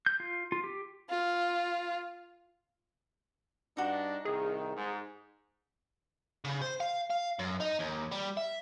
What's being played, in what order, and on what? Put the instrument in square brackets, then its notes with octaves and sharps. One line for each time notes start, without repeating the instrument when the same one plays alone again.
[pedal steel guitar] G6
F4
F4
G4
[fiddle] F4
[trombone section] G2 D4 [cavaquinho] D#4 F#4
[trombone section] C2 D#3 [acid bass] G#4
[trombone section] G#2
[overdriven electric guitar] C#3
C5
F5
F5
F#2
D#4
D#2
G3
E5